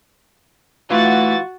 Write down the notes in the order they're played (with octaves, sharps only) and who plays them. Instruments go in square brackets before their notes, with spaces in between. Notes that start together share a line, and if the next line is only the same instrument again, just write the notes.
[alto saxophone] E3 [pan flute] A3 [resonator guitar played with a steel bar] F4 [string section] F#4 A6